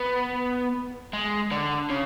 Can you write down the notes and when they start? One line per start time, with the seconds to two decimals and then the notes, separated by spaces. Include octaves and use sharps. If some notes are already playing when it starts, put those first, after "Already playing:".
Already playing: B3
1.13 G#3
1.51 D3
1.90 C#3